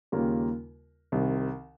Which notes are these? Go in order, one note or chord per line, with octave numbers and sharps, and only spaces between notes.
D#2 C#3 G3 A#3 F4
C2 C3 D#3